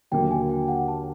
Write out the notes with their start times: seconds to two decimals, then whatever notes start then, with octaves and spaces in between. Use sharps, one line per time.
0.11 D#2 D3 F#3 A#3 G5
0.31 G#5
0.50 G5
0.68 F#5
0.88 A5